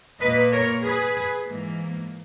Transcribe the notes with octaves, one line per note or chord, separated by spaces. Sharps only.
A#2 A#3 B4 D#5
A#4 C#5
G#4 B4
G#2 E3 A#3